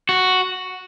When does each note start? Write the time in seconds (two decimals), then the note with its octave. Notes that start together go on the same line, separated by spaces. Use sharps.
0.09 F#4